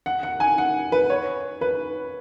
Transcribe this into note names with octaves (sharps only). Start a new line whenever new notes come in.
F#5
F#5
G#5
F#5
B4
C#5
B4